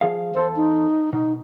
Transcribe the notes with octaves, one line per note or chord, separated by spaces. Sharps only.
F3 G#4 F5
E2 A4 C5 A5
D#4
B2 D#4